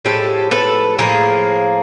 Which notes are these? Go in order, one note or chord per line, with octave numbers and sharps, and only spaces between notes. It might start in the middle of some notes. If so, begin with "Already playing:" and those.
A2 F3 G#3 G4 A4
A4 B4
A2 F3 A#3 G#4 A#4